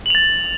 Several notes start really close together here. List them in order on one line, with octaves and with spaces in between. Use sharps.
F#7 F7 A6